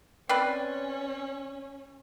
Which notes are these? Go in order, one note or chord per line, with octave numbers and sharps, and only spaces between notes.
C4 C#4 B4 D5